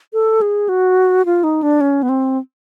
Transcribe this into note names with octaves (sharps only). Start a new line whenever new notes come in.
A4
G#4
F#4
F4
D#4
D4
C#4
B3
C4